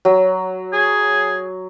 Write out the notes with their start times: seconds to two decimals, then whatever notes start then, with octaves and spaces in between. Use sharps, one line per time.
0.05 F#3
0.73 G#4